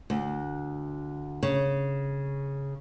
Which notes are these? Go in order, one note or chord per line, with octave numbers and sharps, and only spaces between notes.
D2
C#3